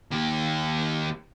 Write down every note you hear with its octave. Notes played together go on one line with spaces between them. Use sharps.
D#2 G4